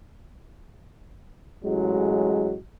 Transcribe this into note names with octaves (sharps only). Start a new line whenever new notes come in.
A1 F#3 G#3